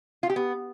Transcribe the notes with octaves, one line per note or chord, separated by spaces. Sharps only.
F4
G4
B3